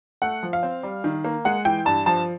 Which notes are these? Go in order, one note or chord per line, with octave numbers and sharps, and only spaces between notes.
A3 F#5
F3
F5
C4
G3
D#3
A#3
G#3 F#5
E3 G5
G2 A5
F3 A5